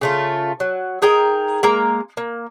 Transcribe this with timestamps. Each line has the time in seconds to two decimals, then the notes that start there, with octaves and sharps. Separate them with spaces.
0.01 C#3 A3 F4
0.60 F#3
1.02 D#4 G#4 A#4 G5
1.63 G#3 A#3 A#5
2.17 A#3